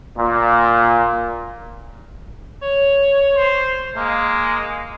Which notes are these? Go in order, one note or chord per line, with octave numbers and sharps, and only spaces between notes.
A#2
C#5
C5
G#3 A#3